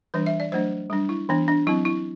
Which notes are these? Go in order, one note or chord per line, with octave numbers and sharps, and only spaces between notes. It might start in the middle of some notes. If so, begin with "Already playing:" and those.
E3 G3 D4 B4
E5
D5
F#3 A3 D4 C5
G3 D4
E4
E3 B3 D4
D4
F#3 C4 E4
E4